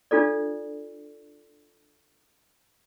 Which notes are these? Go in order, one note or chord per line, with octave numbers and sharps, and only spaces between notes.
D4 F4 A4 D5